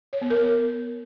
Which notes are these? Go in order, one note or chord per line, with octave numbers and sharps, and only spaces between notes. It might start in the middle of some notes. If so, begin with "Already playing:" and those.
C#5
B3
A#4